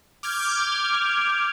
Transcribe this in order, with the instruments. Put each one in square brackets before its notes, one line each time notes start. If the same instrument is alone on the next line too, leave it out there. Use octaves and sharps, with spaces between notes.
[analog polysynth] D6 F6 G6 G#6